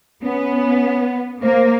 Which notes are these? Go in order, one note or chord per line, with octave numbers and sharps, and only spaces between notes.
B3 C#4
A#3 C5